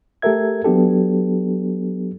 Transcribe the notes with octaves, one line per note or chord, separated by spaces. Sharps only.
A3 G4 A4 A#4 E5 G#6
F#3 B3 D4 G4 A4